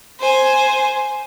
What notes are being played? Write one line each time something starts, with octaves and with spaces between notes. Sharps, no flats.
C5 G#5